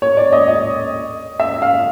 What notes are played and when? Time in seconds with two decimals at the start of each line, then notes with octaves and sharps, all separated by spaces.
0.02 C#5
0.17 D5
0.33 D#5
0.48 D#5
1.40 E5
1.62 F5